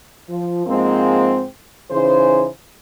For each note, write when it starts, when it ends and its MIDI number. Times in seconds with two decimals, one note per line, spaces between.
0.29 0.65 53
0.66 1.43 44
0.66 1.43 53
0.66 1.43 56
0.66 1.43 58
0.66 1.43 60
1.90 2.46 49
1.90 2.46 52
1.90 2.46 63
1.90 2.46 68
1.90 2.46 72